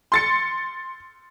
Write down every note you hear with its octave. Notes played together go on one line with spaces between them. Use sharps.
C6 A6 C#7